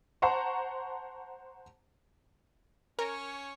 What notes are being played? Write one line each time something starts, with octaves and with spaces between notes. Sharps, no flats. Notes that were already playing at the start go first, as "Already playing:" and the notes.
C5 F#5 A5 A#5 C6 C#6
C#4 A#4 C#5